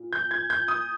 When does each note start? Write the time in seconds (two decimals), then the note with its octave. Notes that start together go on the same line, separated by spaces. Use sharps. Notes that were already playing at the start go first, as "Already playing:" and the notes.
Already playing: A#2
0.13 G6
0.31 G#6
0.50 G6
0.68 D#6